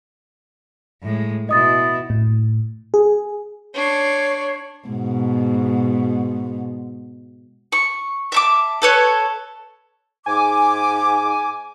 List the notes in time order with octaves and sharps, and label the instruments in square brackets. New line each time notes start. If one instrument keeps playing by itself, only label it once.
[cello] A2 G#3
[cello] B2 E4 [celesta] D#5 D#6 A6
[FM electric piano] A2
G#4
[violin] D4 C7 [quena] C#5
[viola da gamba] G#2 B2
[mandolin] C#6
E5 A5 D6
A4 B4 C#5
[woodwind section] G#2 D6 [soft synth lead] G#5